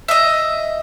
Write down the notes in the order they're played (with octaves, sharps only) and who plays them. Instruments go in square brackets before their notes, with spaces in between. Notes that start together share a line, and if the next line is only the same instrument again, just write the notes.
[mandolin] D#5 E5